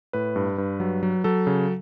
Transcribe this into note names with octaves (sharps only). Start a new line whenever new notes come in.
A2 B4
G2
G2
F#3
F#3
F#3 A4
C#3